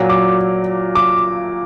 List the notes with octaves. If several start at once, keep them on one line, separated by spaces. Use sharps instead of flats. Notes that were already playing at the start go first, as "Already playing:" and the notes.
Already playing: A#2 F#3
D6
D6